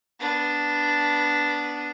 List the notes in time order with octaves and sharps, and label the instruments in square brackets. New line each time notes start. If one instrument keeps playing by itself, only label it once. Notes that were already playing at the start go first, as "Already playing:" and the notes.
[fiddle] B3 D4